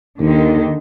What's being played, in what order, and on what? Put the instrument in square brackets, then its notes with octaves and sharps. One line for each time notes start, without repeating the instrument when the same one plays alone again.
[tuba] D#2 [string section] D3 D#3